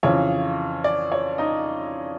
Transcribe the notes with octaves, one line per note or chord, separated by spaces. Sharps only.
F2 C#3 E3 C#5
D5
C#5
D#4 D#5